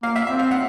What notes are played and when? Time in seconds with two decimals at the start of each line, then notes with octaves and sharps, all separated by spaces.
0.03 A#3 F5
0.16 E5
0.27 C4 E5
0.39 F5
0.51 F#5